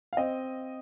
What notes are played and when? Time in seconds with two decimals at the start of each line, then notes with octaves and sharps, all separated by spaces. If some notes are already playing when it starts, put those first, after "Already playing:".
0.13 F5
0.17 C4 D#5